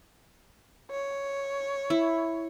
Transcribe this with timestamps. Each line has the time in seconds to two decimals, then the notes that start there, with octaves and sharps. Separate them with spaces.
0.91 C#5
1.90 E4